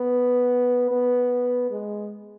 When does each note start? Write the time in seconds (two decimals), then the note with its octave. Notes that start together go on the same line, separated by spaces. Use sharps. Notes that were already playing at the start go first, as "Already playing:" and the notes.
Already playing: B3
0.91 B3
1.71 G#3